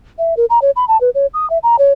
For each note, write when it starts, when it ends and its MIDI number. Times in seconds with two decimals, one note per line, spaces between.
0.19 0.34 76
0.37 0.45 70
0.50 0.59 82
0.62 0.71 73
0.76 0.85 83
0.88 1.00 81
1.01 1.10 71
1.15 1.27 73
1.34 1.48 87
1.50 1.58 76
1.63 1.76 82
1.79 1.93 73